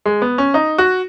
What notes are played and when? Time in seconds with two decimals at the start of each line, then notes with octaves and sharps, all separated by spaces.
0.06 G#3
0.22 B3
0.38 C#4
0.54 D#4
0.78 F#4